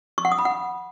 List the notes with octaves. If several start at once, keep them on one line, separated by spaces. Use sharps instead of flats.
C#6
F#5
D#6
B5
F#5